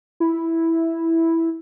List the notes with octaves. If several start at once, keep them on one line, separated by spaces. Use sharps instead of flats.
E4